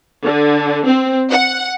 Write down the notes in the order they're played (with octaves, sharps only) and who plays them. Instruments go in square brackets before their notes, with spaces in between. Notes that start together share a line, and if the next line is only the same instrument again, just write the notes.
[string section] D3
C4
F#5